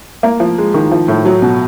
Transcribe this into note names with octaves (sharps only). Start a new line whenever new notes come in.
A#3
F3
G#3
D#3
F3
A2
F#3
B2